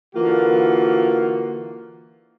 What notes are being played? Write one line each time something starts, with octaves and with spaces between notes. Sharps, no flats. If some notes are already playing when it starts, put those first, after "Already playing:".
D3 E3 A#3 F4 F#4